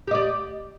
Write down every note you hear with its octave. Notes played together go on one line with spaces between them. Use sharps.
G4 D5 D#5